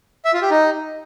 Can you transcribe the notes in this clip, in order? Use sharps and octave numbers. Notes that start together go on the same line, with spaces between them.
E5
F4
G4
D#4